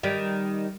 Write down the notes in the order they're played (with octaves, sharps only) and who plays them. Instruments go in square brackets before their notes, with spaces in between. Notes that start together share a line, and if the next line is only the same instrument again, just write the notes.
[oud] D#3 G3